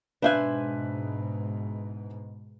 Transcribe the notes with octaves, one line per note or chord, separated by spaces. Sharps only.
G#2 B2 D4 B4 C5 E5 G#5 F#6